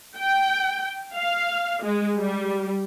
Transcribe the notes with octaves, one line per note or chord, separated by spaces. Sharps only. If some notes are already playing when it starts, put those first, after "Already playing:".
G5
F5
G#3
G3